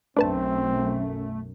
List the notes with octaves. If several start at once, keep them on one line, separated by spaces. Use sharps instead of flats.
B1 F#2 A3 C4 D4 B4 A5